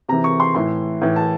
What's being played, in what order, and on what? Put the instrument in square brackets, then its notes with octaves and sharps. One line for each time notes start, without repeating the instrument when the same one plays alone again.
[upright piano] C3 E3 A#5
C#6
C6
A2 E3 C6
A2 E3
A5